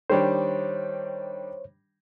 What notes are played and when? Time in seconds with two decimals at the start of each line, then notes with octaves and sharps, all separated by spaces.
0.10 D#3 G3 D4 C5 C#5